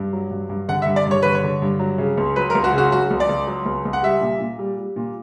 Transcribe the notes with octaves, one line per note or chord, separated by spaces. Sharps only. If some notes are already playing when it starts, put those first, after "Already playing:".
Already playing: G2
F#3
G2
G2
D3 F#5
E5
G2
D5
G2 C#5
D3 B4
C#5
D3
G2
F#3
C#3
C#2
F#3 B4
A#4
C#2
F#4
C#3
F#4
F#3 F#4
C#2
D5
C#2
F#3
C#2
C#2
F#5
G3 E5
A#2
A#2
G3
G3
A#2